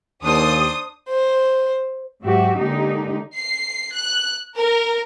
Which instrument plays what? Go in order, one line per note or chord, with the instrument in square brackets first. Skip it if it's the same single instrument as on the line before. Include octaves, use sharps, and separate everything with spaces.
[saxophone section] D#2 [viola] D4 C5 [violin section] D#6
[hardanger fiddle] C5
[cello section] G#2 F#3 F#4 G4 E5
D3 G#3 A#3 D#4 G4
[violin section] C7
F#6
A#4